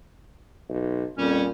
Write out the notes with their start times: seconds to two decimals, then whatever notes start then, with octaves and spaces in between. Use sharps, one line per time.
0.69 B1
1.18 F2 A#2 G3 C#4